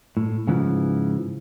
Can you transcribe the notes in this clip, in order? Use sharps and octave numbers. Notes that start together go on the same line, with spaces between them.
A2
G#2 C#3 E3 F3